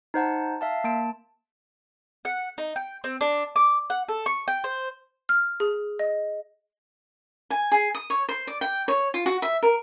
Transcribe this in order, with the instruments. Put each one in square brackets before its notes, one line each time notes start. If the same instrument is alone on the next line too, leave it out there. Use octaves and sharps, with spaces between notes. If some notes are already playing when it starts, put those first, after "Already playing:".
[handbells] D#4 C5 F#5 A5
E5 F5 A5
A#3 A5 D7
[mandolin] F#5
D#4
G5
C4
D4
D6
F#5
A4
C#6
G5
C5
[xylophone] F6
G#4
D#5
[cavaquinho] G#5
G#4
D#6
C#5
C5
D5
G5
C#5
F4
F#4
E5
A#4